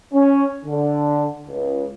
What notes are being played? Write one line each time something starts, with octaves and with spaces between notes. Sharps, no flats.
C#4
D3
C#2